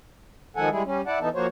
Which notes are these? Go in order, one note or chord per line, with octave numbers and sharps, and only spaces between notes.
D#3 F3 G#3 A4 F#5 G#5
G3 G#3 E4 G#4
G3 C#4
E4 D5 F#5 A5
E3 B3 D#4 A4
F3 A#3 F#4 C5 C#5